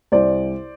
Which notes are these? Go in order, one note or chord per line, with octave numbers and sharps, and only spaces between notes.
C2 C5 D5